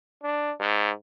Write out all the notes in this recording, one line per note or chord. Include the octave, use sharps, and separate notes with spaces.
D4
G#2